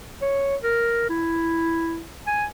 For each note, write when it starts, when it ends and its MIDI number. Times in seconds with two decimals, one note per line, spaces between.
0.22 0.56 73
0.63 1.05 70
1.10 2.03 64
2.27 2.45 80